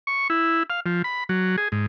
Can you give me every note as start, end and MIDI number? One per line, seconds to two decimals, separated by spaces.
0.07 0.28 85
0.30 0.63 64
0.70 0.80 77
0.86 1.02 53
1.04 1.24 83
1.29 1.56 54
1.58 1.68 68
1.72 1.86 44